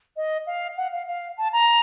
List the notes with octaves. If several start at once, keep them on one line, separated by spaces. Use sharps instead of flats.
D#5
F5
F#5
F5
F5
A5
A#5